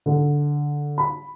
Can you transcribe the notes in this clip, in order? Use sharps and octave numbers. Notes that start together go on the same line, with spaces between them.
D3
B5